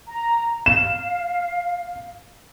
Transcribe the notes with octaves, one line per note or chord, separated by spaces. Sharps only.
A#5
F5 E7